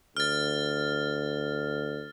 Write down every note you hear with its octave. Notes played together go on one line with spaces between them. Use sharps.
D2 F6 A6